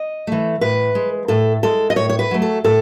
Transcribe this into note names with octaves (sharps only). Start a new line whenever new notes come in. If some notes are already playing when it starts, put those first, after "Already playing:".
Already playing: D#5
E3 A3
A2 B4
G#3
A2 A4
G#3 A4
D#5
A2 C#5
C#5
B4
F#3 A3
A4
A2 A4